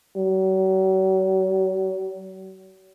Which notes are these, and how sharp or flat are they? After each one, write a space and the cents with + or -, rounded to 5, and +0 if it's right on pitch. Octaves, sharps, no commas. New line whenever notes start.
F#3 +40